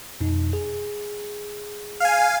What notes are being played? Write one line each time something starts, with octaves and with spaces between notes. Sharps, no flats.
F2 B2 D#4
G#4
F5 G#5